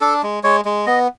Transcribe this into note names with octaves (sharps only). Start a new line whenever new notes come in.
D4 A4
G#3
G#3 C#5
G#3
B3 D#5